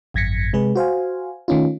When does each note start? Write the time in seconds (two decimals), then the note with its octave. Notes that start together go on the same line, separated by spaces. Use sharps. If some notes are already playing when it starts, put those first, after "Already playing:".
0.14 G#1 F#2 G#6 A#6 B6 C#7
0.53 C3 G#3 G#4 B4
0.75 F#4 C5 F5 G#5
1.48 D#3 A3 C#4 D#4 F4